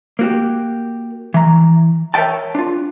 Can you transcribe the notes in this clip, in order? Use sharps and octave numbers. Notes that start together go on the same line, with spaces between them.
A#3 F#4 G4
E3 A#5
A#4 C#5 E5 G5 A5
D4 F4